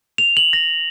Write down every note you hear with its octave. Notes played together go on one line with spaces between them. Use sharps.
F7
F#7
A#6